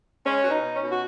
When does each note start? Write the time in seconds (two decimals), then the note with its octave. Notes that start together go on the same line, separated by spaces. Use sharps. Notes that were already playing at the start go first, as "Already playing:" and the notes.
0.24 G#3 C#4
0.42 B2 F#4
0.51 D#4
0.63 B2
0.76 C#4
0.82 B2
0.91 F#4